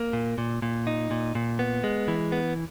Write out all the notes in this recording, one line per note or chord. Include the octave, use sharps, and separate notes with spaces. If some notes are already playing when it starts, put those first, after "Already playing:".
Already playing: A#3
A#2
A#2
A#2
D#4
A#2
A#2
B3
G#3
E3
B3